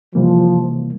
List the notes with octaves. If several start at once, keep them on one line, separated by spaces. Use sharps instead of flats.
C3 E3 F3 G3 A#3